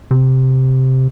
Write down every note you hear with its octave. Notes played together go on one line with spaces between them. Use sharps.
C3